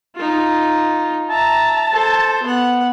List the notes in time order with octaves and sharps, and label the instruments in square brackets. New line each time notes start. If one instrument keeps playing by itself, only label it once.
[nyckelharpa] D#4 F4
[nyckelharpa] E5 A#5 [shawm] A5
[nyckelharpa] A4 C5
B3 F#5